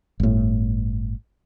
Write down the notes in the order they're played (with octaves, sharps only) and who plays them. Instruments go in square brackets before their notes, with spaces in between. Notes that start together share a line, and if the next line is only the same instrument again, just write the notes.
[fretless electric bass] G1 A2